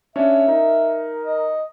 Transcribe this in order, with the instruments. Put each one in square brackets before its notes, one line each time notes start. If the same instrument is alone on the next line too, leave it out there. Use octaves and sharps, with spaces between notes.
[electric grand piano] C#4 D4 C#5 [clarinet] E5
[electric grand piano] D#4 [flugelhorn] A#4
[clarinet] D#5